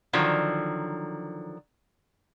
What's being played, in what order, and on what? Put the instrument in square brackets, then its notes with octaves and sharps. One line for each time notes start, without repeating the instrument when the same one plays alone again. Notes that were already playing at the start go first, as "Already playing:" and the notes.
[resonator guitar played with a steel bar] D3 D#3 F3 F#3